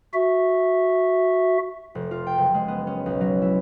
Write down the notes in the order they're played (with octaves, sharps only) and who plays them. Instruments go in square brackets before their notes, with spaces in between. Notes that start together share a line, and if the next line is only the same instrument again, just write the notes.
[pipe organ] F#4 E5
[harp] F1
F4
G5
F#1
G#3
B3
C#4
B1
F#3
E4